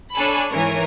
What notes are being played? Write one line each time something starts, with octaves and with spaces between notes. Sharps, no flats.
D4 A4 C#5 G#5 B5
G#1 E3 A#4 C#5 G#5